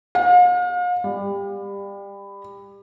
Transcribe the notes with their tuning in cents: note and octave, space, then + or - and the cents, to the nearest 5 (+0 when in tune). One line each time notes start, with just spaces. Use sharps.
F5 +40
G3 +25